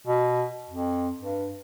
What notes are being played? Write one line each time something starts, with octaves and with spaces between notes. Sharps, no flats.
B2
F2
G2